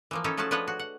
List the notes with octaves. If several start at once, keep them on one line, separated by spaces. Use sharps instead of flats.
E3 F3 A#3
C#4 D#4 E4 A4 C#5
F3 A3 C#4 F#4 G#4 A5
F3 D4 B4 C#5 D#5 F#5
F#4
F#5